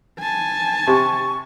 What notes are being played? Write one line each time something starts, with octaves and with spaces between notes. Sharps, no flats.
G#5 A5
C3 C#6